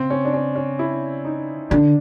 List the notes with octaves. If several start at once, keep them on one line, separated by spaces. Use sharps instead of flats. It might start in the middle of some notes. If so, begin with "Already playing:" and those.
Already playing: C#3 C4
C#4
D4
C#4
C#4
E4
D#4
D3 D4